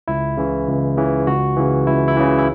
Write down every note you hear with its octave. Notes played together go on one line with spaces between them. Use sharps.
C#2 E4
C#3 E3
C#2
C#3 E3
C#2 F#4
C#3 E3
C#2 E4
E4
C#3 E3
E4